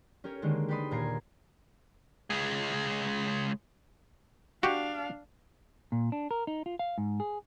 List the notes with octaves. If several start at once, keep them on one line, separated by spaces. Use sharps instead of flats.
C#4 G4 A#4 C#5
D3 D#3 G#3 A#3
G4 B4 D5 B5 C6 D#6
D#2 A#2 A#5 G#6 C7
C#2 G#3
D4 F#4 G4 F5
A#2
D4
A#4
D#4
F4
F5
G#2
G#4